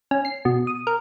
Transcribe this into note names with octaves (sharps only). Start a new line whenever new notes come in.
C#4
C7
B2
D#6
A#4